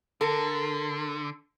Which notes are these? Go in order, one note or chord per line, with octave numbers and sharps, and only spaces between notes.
D3 A4 A#4